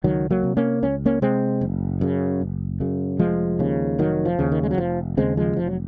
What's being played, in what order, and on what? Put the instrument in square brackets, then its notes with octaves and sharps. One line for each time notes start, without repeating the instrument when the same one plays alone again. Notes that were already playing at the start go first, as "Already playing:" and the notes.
[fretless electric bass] C#2 D#3 F#3
F#3 A#3
C3
A#3 C#4
C#2 C#4
A#3 C#4
C3 G#3 C4
F#1
F#2 C#3
F#1
F#2 C#3
F1 F3 G#3
D#2 C#3
F1 D#3 F#3
F3
D#2 C#3
D#3
G#3
F#3
F1 F3
D#2 C#3 G#3 C4
F3 G#3
F1 F3
F#3